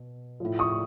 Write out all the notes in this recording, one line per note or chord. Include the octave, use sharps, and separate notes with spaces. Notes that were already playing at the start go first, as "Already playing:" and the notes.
Already playing: B2
A2 F3
C#6 D#6